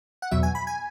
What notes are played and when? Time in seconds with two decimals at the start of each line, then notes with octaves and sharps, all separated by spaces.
0.22 F#5
0.31 E2 B2 F#3 E5
0.43 G#5
0.55 B5
0.67 G#5